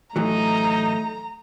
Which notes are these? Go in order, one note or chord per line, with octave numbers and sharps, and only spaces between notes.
A2 E3 F#3 A3 D#4 A#5